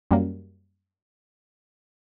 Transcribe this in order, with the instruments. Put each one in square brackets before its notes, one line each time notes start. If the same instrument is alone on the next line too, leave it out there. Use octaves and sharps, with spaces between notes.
[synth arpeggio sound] F#2 G3 A#3